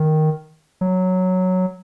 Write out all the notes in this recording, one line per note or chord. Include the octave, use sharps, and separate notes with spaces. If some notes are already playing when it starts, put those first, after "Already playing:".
Already playing: D#3
F#3